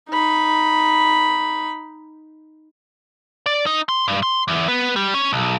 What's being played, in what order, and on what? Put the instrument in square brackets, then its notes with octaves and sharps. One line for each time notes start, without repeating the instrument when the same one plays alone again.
[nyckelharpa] D#4 B5
[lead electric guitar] D5
D#4
C6
G2
C6
E2
B3
G3
C#4
B1